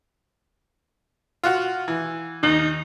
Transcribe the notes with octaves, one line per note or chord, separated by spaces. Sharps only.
F4 F#4 F#5
E3
D#2 D#4